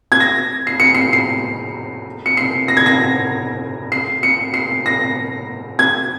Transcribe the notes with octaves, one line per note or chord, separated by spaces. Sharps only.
G#6
A#6
C7
C#7
C7
C7
C#7
C7
A#6
G#6
A#6
C7
C#7
C7
A#6
G#6